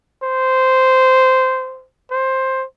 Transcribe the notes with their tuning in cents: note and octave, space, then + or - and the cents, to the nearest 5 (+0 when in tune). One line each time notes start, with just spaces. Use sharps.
C5 -10
C5 +10